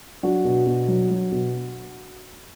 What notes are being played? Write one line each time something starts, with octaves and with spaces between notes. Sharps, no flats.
F#3 D4 F#4
B2
B2
F#3
F#3
B2